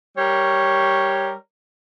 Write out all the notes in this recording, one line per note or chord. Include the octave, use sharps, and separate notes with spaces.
G3 A#4 C#5